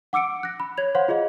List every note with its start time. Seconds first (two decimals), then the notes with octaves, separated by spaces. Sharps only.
0.13 F#5 D6 E6 C#7 D7
0.43 F#6 A#6
0.60 B5
0.77 C#5 G#6 F7
0.95 C5 C#5 F5 F#5 C6
1.08 F4 G#4 D#5 F5